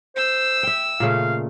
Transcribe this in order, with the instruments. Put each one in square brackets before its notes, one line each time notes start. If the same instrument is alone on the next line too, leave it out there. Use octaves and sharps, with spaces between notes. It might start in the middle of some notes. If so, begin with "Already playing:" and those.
[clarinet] C5 [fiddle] E6
[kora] E5 G5
[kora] A#2 C#3 A3 [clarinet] F5